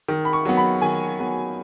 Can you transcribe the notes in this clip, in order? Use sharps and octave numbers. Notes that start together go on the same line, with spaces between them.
D#3
B5
C#6
F#3 B3
B5
D#3 G#5
F#3 B3